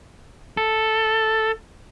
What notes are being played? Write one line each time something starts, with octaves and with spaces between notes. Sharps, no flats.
A4